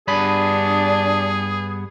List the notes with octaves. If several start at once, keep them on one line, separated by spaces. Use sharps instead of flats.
G2 B3 D4 G#4 B5